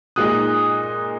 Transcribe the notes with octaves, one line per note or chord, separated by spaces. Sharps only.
A#2 G#3 D#4 D#6 F#6